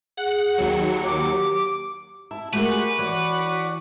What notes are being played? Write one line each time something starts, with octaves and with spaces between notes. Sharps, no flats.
G#4 F#5
D#2 F#3 C#7
G4 D6
E4 A5
G#3 A3 F#4 G4 A#4 B4 C#6
E3 F#4 C#5 D5